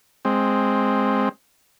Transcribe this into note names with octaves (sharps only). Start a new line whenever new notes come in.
G#3 C4